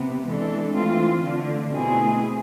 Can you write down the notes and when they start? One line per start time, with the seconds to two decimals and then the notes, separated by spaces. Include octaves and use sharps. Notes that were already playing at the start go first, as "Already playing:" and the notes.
Already playing: C3 B3
0.26 E3 G#3 D4 A4
0.74 E3 A3 C4 F4
1.23 D3 A3 D4
1.71 B2 A3 C4 E4 G#4